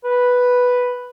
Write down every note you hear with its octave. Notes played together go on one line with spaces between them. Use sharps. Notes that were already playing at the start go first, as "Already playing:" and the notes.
B4